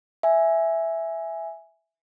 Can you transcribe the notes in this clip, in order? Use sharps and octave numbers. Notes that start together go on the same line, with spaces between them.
E5 G#5